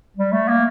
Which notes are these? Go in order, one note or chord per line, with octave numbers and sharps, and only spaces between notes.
G3
A3
A#3